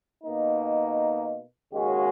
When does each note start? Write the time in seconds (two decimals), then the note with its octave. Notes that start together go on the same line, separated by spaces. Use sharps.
0.23 B2 A#3 D#4
1.72 D#2 C#3 G#3 C#4 F#4